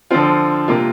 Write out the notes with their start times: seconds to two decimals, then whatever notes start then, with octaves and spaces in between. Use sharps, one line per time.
0.11 D3 F3 C4 F4
0.68 C3 A#3 F4